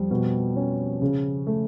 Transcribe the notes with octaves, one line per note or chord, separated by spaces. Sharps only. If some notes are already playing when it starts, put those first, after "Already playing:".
Already playing: F2 G3
B2
C#4
C#3
A3